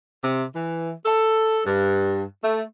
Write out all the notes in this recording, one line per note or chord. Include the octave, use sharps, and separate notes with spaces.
C3
E3
A4
G2
A3